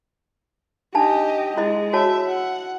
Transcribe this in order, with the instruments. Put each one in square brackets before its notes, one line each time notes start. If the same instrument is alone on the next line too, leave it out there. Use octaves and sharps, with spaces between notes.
[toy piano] D4 D#4 A5 [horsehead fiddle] G4 D#5
[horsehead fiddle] G#3 [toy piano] E4 D#5
[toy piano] F#4 C#5 A5 [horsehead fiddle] E5
[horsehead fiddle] F#5